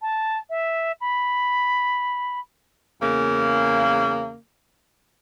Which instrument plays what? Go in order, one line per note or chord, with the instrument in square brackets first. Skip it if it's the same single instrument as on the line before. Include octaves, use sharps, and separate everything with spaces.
[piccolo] A5
E5
B5
[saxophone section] E2 C#3 A#3